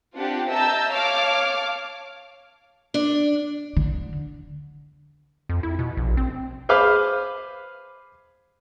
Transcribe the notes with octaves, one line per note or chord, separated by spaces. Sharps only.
C4 D4 F4 G4 F#5
D#5 E5 A5 A#5 E6 G6
C#5 F5 A5 D6 F6
D4
D3
F2
E4
B2
A#1
C4
G#4 B4 C5 F5 D6 F6